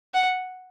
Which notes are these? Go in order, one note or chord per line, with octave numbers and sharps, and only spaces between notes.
F#5